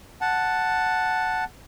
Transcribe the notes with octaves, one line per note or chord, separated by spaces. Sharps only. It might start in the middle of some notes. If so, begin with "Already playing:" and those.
F#5 A5